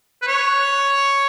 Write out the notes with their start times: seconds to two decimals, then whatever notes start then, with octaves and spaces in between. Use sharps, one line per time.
0.22 B4
0.27 C#5